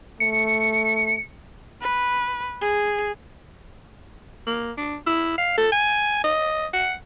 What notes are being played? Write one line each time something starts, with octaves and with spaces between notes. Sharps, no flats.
A3 C#7
B4
G#4
A#3
D4
E4
F5
A4
G#5
D#5
F#5